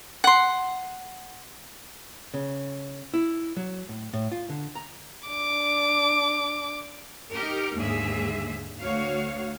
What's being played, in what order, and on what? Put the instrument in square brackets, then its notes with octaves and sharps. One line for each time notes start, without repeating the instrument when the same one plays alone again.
[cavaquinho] F#5 C6
[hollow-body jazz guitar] C#3
E4
F#3
A2
A2
F4
D3
A#5
[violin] D4 D6
[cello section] D#4 G4 A#4
D#2 G#2 D3 A#3 G#4 E5
D2 F#4 C#5 F5